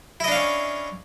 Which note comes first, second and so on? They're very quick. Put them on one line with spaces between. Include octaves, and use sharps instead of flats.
E4 D#5 D4 F5 C#4